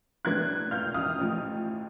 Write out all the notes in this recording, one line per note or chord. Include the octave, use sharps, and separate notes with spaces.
A2 F#3 B3 D4 F#6 G#6
F6 G6
D#6 F6
A1 A2 F3